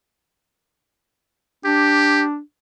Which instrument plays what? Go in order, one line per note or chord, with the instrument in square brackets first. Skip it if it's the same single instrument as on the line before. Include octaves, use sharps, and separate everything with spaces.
[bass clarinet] D4 [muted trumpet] G4